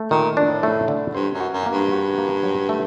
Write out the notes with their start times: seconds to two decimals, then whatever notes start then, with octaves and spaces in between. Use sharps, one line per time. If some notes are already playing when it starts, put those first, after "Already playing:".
Already playing: A3
0.11 A#2 D#3
0.37 A2 D4
0.63 A3
0.88 D3
1.15 G2 C5
1.34 F#2
1.41 F#4
1.53 F#2
1.66 A#3
1.72 G2
1.92 F#4
2.18 A#3
2.43 F#3
2.69 A3